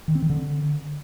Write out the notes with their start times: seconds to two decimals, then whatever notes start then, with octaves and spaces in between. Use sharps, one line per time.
0.08 D#3
0.15 C4
0.22 D#3
0.30 D3